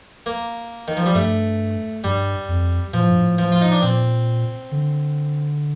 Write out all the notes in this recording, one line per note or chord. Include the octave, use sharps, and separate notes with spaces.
A#3
D#3
F3
G3
G2 A3
G2 G3
F2
A#2 F3
A2
G2
A2
F3
F4
D#4
D4
A#2 C4
D3